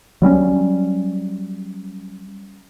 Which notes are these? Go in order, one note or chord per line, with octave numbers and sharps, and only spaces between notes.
F#3 G3 C4 C#4